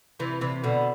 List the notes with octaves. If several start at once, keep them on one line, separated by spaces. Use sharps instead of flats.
C3 E3
C3 E3
B2 D3